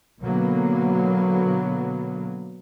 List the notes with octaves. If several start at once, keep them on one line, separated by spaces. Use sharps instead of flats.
B2 D3 F#3 A#3 B3